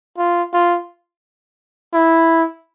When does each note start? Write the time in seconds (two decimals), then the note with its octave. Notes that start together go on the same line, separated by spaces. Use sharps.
0.18 F4
0.53 F4
1.94 E4